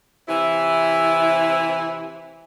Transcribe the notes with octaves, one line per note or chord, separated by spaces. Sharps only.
C3 E3 E4